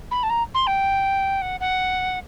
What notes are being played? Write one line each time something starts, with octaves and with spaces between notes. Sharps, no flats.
B5
A5
A#5
C6
G5
F#5
F#5